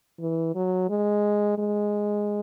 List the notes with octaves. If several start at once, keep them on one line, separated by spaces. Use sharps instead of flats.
E3
F#3
G#3
G#3